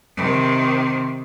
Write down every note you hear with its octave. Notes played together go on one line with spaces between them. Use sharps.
C3 D#3